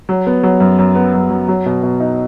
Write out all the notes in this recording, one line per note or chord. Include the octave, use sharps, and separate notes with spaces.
F#3
B3
F#3
F#2
F#2
B3
F#2
F#2
F#3
B2
B2
D#4